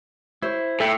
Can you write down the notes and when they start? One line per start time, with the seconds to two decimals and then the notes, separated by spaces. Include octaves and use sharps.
0.42 E4 C5 C#5
0.80 A2 A4 E5 G5